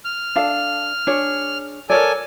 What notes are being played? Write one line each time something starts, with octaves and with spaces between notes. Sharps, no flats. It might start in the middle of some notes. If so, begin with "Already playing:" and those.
F6
D4 A4 F5
D4 G#4 C#5
A4 A#4 C#5 D5 G#5